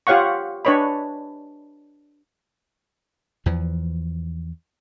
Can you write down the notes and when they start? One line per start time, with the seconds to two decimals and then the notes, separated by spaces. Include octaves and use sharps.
0.07 F4 G4 C#5 F5 F#5 C#6
0.65 D4 B4 C#5 D#5 B5
3.46 E2 E3 F3